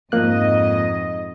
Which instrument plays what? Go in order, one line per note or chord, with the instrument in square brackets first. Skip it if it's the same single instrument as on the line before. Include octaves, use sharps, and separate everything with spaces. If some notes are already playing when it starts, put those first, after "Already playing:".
[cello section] F2 G#2 D#5 [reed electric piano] F3 A#3 F#6